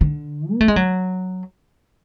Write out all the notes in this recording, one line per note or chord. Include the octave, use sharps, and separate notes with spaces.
D3
B3
A3
G#3
F#3